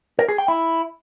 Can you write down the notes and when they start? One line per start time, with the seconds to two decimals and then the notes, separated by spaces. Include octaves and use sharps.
0.19 A#4
0.29 G#4
0.38 G5
0.48 E4